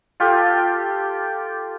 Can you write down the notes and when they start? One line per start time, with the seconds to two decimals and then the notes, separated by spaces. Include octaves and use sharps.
0.20 F4 G4 A4 G5